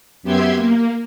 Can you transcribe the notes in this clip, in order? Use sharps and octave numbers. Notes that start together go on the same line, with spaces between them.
F#2 B3 G4 E5 C6 G#6
A#3